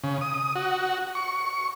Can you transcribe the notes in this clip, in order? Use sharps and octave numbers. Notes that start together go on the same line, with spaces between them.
C#3
D#6
F#4
C#6